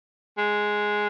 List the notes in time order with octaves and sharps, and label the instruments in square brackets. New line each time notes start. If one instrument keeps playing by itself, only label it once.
[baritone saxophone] G#3